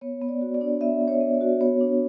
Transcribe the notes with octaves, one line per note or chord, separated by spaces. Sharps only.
B3 C#5
B3
D5
F#4
D5
D4
B3 E5
B3
C#5
B3
D5
F#4
B3 C#5
D4